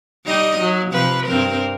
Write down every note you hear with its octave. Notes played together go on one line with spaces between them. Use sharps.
G3 D#4 D#5
F#3
C3 F3 B4
G2 C4 A#4